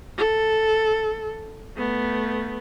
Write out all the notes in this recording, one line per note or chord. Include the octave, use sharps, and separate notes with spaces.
A4
A3 B3